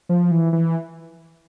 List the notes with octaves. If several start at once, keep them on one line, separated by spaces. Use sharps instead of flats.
F3
E3
E3